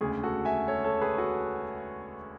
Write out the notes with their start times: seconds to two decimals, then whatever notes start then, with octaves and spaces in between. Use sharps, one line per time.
0.01 E1 D2 C#3 G#4
0.23 F#4 A4
0.45 E5 G#5
0.68 A4 C#5
0.84 A4 C#5
1.01 G#4 B4
1.18 F#4 A4